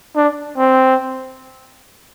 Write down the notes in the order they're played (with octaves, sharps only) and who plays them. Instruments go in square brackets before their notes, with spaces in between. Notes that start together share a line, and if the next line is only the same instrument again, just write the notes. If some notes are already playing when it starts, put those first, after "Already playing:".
[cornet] D4
C4